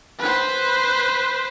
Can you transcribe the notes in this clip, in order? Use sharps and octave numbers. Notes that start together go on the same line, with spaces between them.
B4 C5